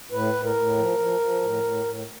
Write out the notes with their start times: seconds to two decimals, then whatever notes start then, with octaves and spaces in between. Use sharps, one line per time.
0.11 A2 B4
0.34 A2
0.44 A#4
0.55 A2
0.77 F3
0.99 F3
1.20 F3
1.42 A2
1.63 A2
1.85 A2